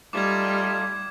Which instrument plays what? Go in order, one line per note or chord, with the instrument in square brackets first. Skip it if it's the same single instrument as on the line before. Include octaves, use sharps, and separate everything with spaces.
[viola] G3 [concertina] A3 D#4 F4 [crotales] D6 G#6